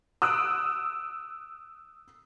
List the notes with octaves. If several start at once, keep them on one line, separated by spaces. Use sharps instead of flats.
D#6 E6 F#6 D7